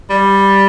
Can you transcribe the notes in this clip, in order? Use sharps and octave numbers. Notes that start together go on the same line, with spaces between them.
G3